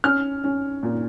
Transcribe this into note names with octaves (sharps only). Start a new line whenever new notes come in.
C#4 F6
C#4
A#2